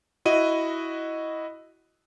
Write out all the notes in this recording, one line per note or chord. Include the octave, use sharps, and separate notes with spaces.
E4 F#4 D#5 D#7